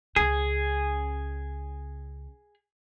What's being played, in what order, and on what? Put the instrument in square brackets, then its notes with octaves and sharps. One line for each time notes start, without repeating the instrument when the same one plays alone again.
[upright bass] C#2 C#3 [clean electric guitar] G#4